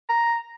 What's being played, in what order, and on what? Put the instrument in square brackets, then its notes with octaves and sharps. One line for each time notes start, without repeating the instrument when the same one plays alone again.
[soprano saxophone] A#5